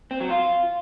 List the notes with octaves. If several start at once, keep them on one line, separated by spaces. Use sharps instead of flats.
C4
F#3
F4